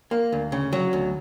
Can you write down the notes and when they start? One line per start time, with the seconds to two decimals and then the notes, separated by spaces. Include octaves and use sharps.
0.11 A#3
0.32 D2
0.52 C#3
0.73 F#3
0.93 D2